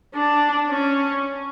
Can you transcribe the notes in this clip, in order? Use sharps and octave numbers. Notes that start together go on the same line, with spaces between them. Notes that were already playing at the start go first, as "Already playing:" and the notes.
D4
C#4